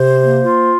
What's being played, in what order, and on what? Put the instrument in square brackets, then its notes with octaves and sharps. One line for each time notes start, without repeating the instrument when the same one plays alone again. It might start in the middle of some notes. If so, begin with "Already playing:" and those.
Already playing: [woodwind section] C3 [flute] C5
[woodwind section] A#3
F4